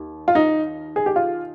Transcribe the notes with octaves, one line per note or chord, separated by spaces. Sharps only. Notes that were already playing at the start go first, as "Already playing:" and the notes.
Already playing: D#2 D#3
F4
D#4
G#4
G4
F4